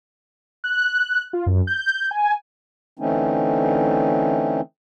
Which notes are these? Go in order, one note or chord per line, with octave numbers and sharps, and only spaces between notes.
F#6
F4
F#2
G6
G#5
D3 E3 A3 C4 C#4 D#4